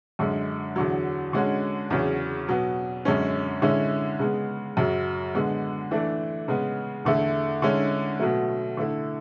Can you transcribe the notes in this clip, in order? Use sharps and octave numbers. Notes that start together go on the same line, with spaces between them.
F#2 D3 G#3
E2 D3 F#3
D3 G#3 C#4 F#4
E2 C#3 F#3 C#4
B2 F#3 B3
F#2 D3 G#3 C#4
D3 G#3 C#4 E4
C#3 G#3 B3
F#2 C#3 F#3
D3 G#3 B3
E3 A3 D4
C#3 G#3 B3
E2 D3 A3 E4
D3 G#3 C#4 E4
B2 F#3 A3
D3 A3 E4